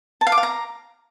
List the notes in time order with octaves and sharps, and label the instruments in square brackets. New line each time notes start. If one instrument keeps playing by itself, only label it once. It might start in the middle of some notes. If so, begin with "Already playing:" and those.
[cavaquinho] A5
F5
D6
F5
A#5